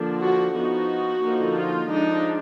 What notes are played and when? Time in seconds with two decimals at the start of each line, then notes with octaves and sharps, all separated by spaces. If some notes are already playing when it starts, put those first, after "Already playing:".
Already playing: D3 F3 A#3 D4
0.23 F#4
0.56 F3 B3 D#4 F#4
1.23 D3 F3 A#3 D#4
1.55 F4
1.89 F3 G#3 D4 D#4